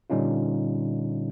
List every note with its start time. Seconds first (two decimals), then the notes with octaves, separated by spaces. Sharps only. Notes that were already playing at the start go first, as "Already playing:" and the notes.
0.10 A#2 D3 G3 C#4 D#4 F4